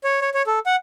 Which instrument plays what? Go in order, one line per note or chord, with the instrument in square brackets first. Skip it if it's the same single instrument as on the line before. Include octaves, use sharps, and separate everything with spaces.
[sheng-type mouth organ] C#5
C#5
C#5
A4
F#5